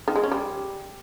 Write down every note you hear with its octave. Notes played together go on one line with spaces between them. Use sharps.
D#3
G#3
C#4
G3